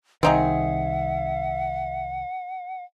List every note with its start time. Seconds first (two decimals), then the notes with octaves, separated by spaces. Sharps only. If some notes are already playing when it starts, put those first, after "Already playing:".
0.23 C2 D#3 C4 D#4 G#4 E5 F#5